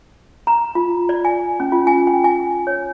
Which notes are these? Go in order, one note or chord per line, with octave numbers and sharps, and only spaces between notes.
A#5
F4
D5
G#5
C#4
F4
G#5
G5
G#5
C#5